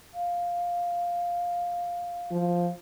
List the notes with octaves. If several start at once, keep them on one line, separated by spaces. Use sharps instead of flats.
F5
F3